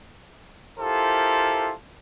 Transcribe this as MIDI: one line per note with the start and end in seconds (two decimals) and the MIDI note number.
0.78 1.73 64
0.78 1.73 65
0.78 1.73 67
0.78 1.73 69
0.78 1.73 70
0.78 1.73 72